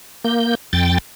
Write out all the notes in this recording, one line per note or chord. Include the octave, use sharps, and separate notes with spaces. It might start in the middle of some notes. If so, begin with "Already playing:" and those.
A#3 G6
F2 G5 A6